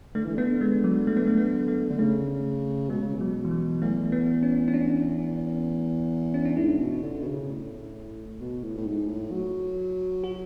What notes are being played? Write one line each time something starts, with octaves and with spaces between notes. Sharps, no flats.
D3 A3
E3
D3 B3
G#3
F#3
A3
B3
A3
B3
A3
D3
C#3 A3
B2 G#3
C#3
B2
F#3
E3
F#3
E2 A3
A3
B3
C#4
C#4
D4
C#4
D4
G#2 E4
B2
D3
B2
C#3
A2
B2
A2
A2
G#2
A2
F#3
F#4